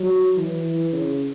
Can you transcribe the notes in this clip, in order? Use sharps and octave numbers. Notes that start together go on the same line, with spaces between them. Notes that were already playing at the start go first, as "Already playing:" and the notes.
Already playing: F#3
E3
C#3